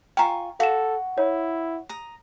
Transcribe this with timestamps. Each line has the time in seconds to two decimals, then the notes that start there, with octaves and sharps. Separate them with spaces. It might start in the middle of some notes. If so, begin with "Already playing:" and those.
0.17 F4 G5 G#5 A#5 C#6
0.60 F#4 A4 F5 E7
1.18 E4 C#5
1.89 A#5 D#6